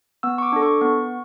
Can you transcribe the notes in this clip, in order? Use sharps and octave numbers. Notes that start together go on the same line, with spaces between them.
B3 E6
C#6
D6
D4 A4
C#6
B3